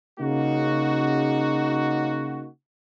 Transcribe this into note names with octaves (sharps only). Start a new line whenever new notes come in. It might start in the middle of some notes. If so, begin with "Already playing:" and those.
C#3 A#3 D#4 F#4